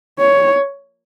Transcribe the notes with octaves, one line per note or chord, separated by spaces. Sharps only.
C#5